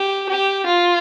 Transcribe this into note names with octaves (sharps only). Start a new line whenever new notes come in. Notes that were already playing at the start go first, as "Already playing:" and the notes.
Already playing: G4
G4
F4